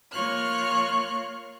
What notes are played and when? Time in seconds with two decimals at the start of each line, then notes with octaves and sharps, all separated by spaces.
0.12 A#3 F4 C#5 C#6 F6 F#6